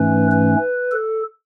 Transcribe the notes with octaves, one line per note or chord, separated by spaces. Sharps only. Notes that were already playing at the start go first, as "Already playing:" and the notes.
Already playing: G#2 E3 A3 C#4 B4
B4
A4